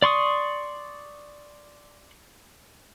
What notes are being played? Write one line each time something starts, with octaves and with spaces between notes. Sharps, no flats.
D5 C6 C#6 D#6